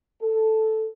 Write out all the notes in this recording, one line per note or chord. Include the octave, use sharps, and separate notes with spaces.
A4